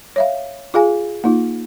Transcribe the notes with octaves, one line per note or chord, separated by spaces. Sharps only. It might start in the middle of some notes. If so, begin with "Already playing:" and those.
C#5 E5 F5
F4 G#4 F5 G#5
A#3 D#4 F4